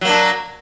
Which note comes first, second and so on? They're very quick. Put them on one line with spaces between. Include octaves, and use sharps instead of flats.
F#3 A#3 D4